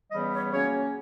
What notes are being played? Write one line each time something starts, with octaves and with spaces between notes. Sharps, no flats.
C#3 E3 G3 B3 D#5
C#5
C#3 F#3 A#3 C#4 C#5